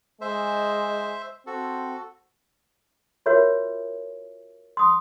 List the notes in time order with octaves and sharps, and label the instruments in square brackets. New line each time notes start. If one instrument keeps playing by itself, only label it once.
[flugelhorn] G#3 [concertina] C5 E5
[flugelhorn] C4 [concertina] F#4 A4
[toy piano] F4 F#4 A#4 C#5 E5
C6 D#6